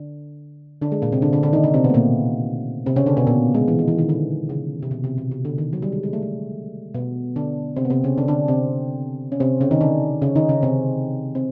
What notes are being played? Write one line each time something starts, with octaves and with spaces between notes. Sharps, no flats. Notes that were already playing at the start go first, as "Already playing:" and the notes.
Already playing: D3 D4
D3 D4
G#3
A#2 A#3
C3 C4
D3 D4
D3 D4
D3 D4
D#3 D#4
D3 D4
C3 C4
B2 B3
A3
A#2 A#3
C3 C4
C#3 C#4
D3 D4
B2 B3
A#2 A#3
G#3
E3
D#3
E3
D#3
D3
C#3
C3
B2
C3
B2
C3
D3
D#3
F#3
G3
G#3
G#3
A3
G#3
B2 B3
D3 D4
C3 C4
B3
C3 C4
C#3 C#4
D3 D4
D3 D4
C3 C4
C#4
C3 C4
C#3 C#4
D#3 D#4
D3 D4
C#3 C#4
D#3 D#4
C#3 C#4
C3 C4
C4